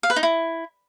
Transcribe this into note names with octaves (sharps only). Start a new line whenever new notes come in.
F5
B4
D#4
E4